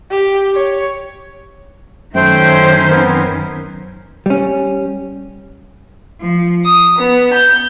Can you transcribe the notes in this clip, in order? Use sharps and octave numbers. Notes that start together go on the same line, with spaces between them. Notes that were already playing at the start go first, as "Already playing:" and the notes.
G4
C#5
F#2 D#3 A3 C#4 C5 G5
B3 C4 A#4
G3 C#4
F3
D#6
B3
G6